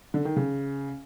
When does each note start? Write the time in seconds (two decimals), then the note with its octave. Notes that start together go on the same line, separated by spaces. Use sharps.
0.14 D3
0.25 D#3
0.36 C#3